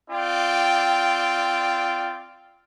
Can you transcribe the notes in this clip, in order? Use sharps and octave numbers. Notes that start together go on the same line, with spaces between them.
C4 F4 D5 G5